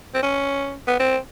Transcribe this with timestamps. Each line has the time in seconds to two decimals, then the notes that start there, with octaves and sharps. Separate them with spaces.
0.14 C4
0.23 C#4
0.87 B3
0.99 C4